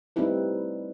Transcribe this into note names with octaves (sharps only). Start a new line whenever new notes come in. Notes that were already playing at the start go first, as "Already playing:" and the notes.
G3 A3 C4 D#4 E4 B4